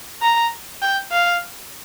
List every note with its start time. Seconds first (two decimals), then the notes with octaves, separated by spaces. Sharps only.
0.22 A#5
0.82 G5
1.12 F5